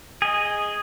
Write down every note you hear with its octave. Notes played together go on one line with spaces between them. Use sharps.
G#4 D#5